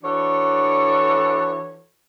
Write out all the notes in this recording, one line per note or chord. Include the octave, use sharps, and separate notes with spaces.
E3 D4 F#4 A4 C#5